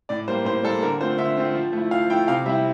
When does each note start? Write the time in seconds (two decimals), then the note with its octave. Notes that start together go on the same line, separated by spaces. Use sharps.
0.09 A2 D5
0.28 G3 A#3 C5
0.45 A2 C5
0.63 G3 A#3 A4
0.82 D3 A#4
1.00 A3 C4 F4 C5
1.18 D3 E5
1.37 A3 C4 F4
1.55 F3
1.73 A3 E4
1.91 F3 F5
2.10 A3 E4 G5
2.28 C3 F5
2.46 G3 C4 E4 E5